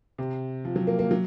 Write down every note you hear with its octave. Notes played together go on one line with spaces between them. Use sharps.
C3
F3
F#3
A#3
A#3
F#3